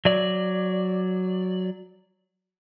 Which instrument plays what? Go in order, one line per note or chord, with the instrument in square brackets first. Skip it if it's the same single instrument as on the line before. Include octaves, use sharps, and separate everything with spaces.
[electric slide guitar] F#3 D5